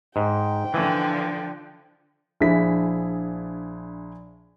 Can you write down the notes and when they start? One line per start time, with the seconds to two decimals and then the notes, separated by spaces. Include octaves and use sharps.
0.16 G#2 G5
0.74 D3 E3 F3
2.41 A#1 D4 E4 G#4 B6